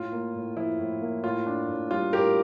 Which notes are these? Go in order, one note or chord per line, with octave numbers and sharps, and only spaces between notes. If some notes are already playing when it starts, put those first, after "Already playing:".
Already playing: A2 F4
A#3
A2
F3 E4
A2
A#3
A2 F4
D4
A2
G3 F4
A2 G4 A#4